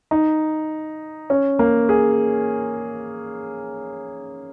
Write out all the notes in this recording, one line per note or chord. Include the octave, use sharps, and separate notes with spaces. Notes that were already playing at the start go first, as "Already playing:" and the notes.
D#4
C#4
A#3
G#4